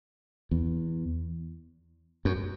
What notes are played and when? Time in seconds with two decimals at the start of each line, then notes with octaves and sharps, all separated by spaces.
0.51 E2
2.25 F#2